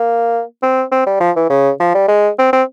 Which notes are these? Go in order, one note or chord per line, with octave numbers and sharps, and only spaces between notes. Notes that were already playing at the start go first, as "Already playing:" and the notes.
Already playing: A#3
C4
C4
G3
F3
E3
C#3
F3
G3
G#3
C4
C4